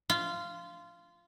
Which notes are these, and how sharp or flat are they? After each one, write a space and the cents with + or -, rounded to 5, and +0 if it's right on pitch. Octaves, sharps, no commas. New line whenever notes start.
F4 -15